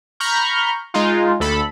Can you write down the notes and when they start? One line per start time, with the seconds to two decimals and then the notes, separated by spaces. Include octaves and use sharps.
0.20 A#5 B5 C#6 F6 G6
0.94 G#3 D#4 F4
1.40 D2 A4 B5